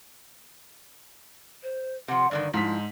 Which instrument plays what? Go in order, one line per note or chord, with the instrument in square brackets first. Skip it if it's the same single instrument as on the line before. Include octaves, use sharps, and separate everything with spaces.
[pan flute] C5
[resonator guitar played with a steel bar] C3 F3 [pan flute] F#5
[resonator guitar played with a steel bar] G2 D3 D#3 [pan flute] D5
[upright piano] G#2 B6 [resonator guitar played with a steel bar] F3 [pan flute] E4